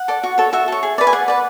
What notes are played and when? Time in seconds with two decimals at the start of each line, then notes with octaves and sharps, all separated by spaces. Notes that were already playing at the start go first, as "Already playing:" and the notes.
Already playing: F#5
0.08 A4 D5
0.23 F#4
0.38 A4 C#5
0.53 F#4 E5
0.68 A4 C#5
0.83 G#4
0.98 B4 D5
1.07 G#5
1.13 G#4 F#5
1.28 B4 D5